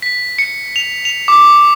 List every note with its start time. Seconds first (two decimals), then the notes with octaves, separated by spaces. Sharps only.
0.02 B6
0.38 C#7
0.76 F7
1.05 F7
1.28 D6